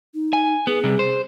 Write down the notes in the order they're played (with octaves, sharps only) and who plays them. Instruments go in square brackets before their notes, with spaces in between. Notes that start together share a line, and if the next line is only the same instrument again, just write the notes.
[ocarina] D#4
[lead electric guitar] G#5
[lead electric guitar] B3 [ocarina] G#4
[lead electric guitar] C3 G3
C5